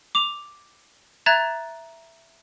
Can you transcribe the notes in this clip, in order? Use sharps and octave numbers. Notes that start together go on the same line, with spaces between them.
D6 F7
E5 A#5 F#6 G#6 A6 E7